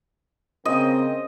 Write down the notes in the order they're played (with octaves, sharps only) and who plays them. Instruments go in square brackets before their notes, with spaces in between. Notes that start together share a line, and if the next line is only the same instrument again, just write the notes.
[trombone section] C#3 A#3 C4 [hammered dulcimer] D#5